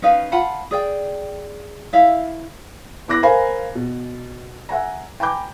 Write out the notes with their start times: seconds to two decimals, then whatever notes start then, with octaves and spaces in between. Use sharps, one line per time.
0.02 C#4 D#4 B4 F5
0.32 F4 F#5 A5 B5
0.71 G#4 D5 G5
1.93 E4 E5 F5
3.08 B3 E4 D6 F#6 A#6
3.23 A#4 C5 F5 G#5 A#5 B5
3.75 B2
4.69 E5 F#5 G#5 A#5
5.20 G5 G#5 A#5 B5 D6 G6